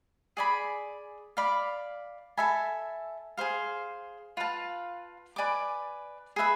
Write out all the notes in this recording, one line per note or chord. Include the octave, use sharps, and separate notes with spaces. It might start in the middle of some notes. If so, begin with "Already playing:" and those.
G#4 D5 G#5 B5
D5 F5 B5
A4 E5 G#5 B5
G#4 C5 F5
F4 B4 F5 A5
B4 D5 G#5 D6
G#4 B4 E5 B5